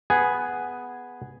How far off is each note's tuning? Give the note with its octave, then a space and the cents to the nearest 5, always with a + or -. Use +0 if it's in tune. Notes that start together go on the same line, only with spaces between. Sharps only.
B3 +0 G#4 +0 G#5 +0